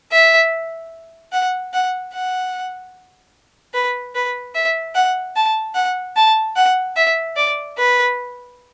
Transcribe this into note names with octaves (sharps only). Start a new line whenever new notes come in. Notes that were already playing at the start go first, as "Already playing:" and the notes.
E5
F#5
F#5
F#5
B4
B4
E5
F#5
A5
F#5
A5
F#5
E5
D5
B4